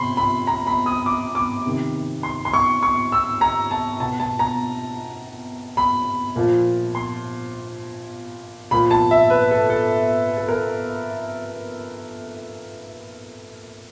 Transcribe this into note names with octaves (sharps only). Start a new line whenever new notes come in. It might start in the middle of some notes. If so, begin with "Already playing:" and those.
Already playing: C3 F3 B5 C6
B5
A#5
B5
D#6
D6
D6
C3 D#3
C6
C6
C#6
C#6
E6
A#5
A5
B2 A5
A5
A#5
B5
A#2 F3
C6
A#2 F3 B5
A5
E5
B4
A4
A4
A4
A#4